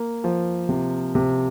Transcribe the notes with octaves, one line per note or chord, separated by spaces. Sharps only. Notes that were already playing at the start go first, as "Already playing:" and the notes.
Already playing: A#3
F3
C3
C3